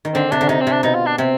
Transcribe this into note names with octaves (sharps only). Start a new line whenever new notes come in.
D#3
D3 C4
C3 D4
D3
C3 D#4
C4
C3
D4
B2 D#4
F4
D4
C3 C4